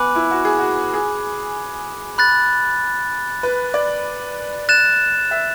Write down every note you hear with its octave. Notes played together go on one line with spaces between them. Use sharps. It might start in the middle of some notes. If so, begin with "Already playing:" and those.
Already playing: B3 G#5 B5 D6 F#6
E4
F#4
G#4
F#4
G#4
B5 F#6 A6
B4
D5
F#6 A6 E7
E5